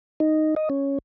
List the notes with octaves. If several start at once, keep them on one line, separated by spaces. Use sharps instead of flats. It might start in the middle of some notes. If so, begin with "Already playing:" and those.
D#4
D#5
C#4